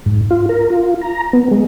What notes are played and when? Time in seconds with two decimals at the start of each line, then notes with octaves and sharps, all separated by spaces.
0.06 G#2
0.31 F4
0.49 A#4
0.70 F4
1.01 A#5
1.33 B3
1.51 G#3